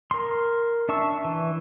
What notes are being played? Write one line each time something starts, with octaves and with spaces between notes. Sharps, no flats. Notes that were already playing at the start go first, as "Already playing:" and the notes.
A#4 C6
D4 E5 A5 C#6 E6
E3